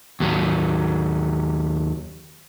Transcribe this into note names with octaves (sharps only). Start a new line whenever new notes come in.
D#2 F#3